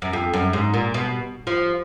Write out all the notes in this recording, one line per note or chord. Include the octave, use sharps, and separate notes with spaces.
F#2
F2
F#2
G#2
A#2
B2
F3